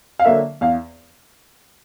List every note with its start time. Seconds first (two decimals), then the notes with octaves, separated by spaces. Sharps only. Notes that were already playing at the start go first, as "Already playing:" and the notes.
0.19 F5
0.25 D3 F#3 A#3 E5
0.61 E2 F5